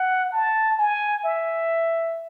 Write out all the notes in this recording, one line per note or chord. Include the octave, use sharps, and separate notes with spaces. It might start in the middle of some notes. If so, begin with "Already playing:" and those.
Already playing: F#5
A5
G#5
E5